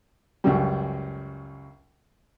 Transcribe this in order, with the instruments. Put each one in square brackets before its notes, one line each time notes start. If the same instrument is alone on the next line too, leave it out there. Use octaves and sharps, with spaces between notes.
[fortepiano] C#2 F#2 G3